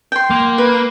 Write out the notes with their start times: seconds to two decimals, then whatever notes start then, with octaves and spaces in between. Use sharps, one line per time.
0.12 G5 C6
0.30 A#3
0.58 B4